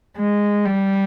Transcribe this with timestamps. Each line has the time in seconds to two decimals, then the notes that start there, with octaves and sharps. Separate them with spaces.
0.18 G#3
0.65 G3